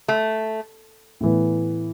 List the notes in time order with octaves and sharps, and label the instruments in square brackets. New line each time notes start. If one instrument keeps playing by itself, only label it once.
[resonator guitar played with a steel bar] A3
[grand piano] A2 E3 B3